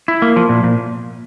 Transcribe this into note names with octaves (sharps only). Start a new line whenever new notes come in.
E4
A#3
F3
A#2
A#2